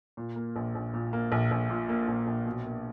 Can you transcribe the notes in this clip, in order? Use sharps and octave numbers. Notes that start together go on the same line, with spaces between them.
A#2
A#3
A#1
A#1
A#2
A#3
A#1
A#1
A#2
A#3
A#1
A#1
B2
A#3